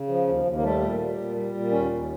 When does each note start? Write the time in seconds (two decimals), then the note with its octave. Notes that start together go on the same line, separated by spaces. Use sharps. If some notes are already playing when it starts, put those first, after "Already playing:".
Already playing: C#3
0.09 F3
0.27 D#2
0.45 D#2
0.55 A#3
0.63 G3 A3
0.82 A#2
1.00 G3
1.18 A#2
1.36 G3
1.54 A#2
1.71 D#2 C#4
1.90 D#2